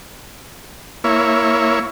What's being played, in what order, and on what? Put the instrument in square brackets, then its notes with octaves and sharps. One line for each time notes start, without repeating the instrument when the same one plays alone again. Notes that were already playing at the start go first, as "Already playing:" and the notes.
[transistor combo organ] A#3 E4 C#5